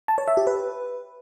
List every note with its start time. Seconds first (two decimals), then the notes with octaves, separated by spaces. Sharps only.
0.08 A5
0.18 C#5
0.28 E5
0.37 G4
0.47 B4